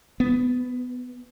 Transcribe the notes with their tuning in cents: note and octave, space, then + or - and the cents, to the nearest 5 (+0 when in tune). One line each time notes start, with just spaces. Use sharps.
B3 +15